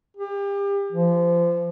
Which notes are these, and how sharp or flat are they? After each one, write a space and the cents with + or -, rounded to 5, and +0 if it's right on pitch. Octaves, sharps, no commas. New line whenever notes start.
G4 +35
F3 -25